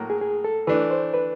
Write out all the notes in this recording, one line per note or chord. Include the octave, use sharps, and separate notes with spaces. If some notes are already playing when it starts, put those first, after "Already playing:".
Already playing: A2 F#3 A#3
G#4
G#4
A4
E3 A3 D4 B4
C5
B4